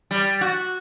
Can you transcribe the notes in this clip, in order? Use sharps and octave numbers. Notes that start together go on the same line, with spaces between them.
G3
F#4